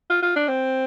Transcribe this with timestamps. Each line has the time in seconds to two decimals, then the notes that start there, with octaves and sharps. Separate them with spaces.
0.10 F4
0.23 F4
0.36 D4
0.48 C4